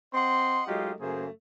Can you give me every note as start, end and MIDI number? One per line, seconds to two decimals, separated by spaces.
0.14 0.63 60
0.14 0.63 75
0.14 0.63 78
0.14 0.63 84
0.68 0.93 54
0.68 0.93 56
0.68 0.93 57
0.68 0.93 63
0.68 0.93 65
0.68 0.93 67
1.01 1.27 42
1.01 1.27 49
1.01 1.27 57
1.01 1.27 58
1.01 1.27 68
1.01 1.27 72